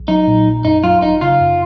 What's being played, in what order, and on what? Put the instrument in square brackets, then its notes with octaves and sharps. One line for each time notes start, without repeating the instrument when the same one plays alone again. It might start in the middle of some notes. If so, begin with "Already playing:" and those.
Already playing: [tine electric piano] A#1
[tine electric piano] F#3 [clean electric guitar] D#4
[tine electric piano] A#2
A#1
[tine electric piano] F#2 [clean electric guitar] D#4
[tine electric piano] F#3 [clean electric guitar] F4
[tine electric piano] G#1 [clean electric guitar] D#4
[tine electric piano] C#3 [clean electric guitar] F4
[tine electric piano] F#2